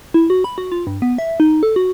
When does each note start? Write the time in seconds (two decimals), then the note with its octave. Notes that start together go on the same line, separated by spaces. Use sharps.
0.14 E4
0.30 F#4
0.44 B5
0.58 F#4
0.72 F4
0.87 G2
1.02 B3
1.18 E5
1.40 D#4
1.63 A4
1.76 F#4